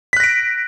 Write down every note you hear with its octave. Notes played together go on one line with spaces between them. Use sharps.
F#6 A#6 B6 D7